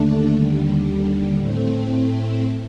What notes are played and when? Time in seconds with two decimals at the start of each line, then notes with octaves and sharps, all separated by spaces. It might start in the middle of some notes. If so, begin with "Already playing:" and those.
Already playing: D#2 D3 A3 D4
0.33 D#2 D3 G3
1.38 A2 A3 C4